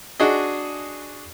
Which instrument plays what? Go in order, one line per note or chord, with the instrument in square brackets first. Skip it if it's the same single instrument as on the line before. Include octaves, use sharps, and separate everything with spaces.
[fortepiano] D4 F#4 G#4 D#5